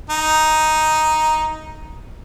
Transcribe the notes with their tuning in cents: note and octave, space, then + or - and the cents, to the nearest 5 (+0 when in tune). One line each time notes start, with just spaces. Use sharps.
D#4 +5